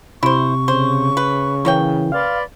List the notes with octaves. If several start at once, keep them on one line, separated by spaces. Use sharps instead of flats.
C3 E4 C5 C#6
C#3 C5
B4
E3 A#3 C#5 G5
B4 D5 F5 C6